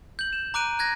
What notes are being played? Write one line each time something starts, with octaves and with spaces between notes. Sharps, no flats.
G6 F#7
E7
A#5 D6 F#6 D7 D#7
F#6 G#6 A#6